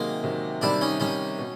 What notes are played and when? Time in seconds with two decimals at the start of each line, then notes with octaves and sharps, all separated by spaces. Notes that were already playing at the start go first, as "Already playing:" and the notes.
Already playing: C3 D#3 F#3 G#3 A#3
0.24 C3 D#3 F#3
0.61 C3 D#3 G3 D4 E4
0.81 C#4 D#4
1.00 C3 D#3 G3 C#4 D#4
1.39 B2